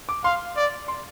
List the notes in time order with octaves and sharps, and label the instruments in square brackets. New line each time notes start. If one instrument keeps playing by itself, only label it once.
[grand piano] D6
[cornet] F5 [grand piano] C6
[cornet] D5
[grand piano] C6